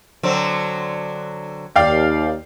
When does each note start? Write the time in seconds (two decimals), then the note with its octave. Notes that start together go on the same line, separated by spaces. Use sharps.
0.23 D3 F#3 C4
1.76 D#2 D5 F5 G5